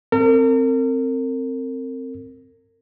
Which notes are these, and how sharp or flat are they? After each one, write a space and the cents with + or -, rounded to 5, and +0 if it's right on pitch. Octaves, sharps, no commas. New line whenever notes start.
C4 +5 A#4 -40